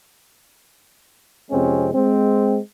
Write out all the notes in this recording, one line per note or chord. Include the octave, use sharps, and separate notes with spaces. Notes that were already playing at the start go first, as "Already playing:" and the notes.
F2 C3 G#3 C4 C#4
G#3 C4